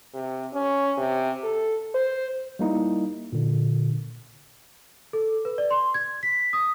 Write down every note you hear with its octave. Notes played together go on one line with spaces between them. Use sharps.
C3
C#4
C3
A4
C5
G3 A#3 D#4 E4
A#2 D3
A4
B4
D5
C6
G#6
B6
D#6